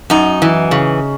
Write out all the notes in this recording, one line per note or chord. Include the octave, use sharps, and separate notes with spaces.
F#2 D#4
E3
C#3